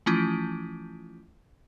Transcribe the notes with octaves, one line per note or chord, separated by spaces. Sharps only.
E3 F3 A3 C#4 E4 F4